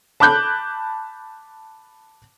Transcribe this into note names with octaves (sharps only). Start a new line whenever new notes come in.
A5 B5 D6 F#6 G6